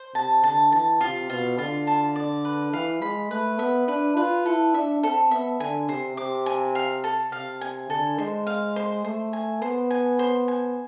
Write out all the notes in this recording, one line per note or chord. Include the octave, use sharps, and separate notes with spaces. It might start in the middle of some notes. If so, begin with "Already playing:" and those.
Already playing: C5
C3 A5
D3 A5
E3 A5
C3 F4
B2 F4
D3 F4
A5
D5
B4
E3 F5
G#3 B5
A3 B4
B3 E5
D4 B4
F4 B4
E4 A4
D4 E5
C4 A4
B3 E5
D3 G#5
C3 C5
C3 D6
G#5
F5
A4
C3 F5
G#5
D3 A4
G#3 C5
F5
C5
A3 C5
G#5
B3 C5
G#5
C5
G#5